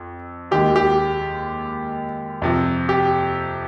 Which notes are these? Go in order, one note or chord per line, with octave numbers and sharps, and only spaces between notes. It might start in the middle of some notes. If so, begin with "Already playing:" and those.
Already playing: F2
D#2 D#3 G#3 G4
G4
F2 C3 F3
G4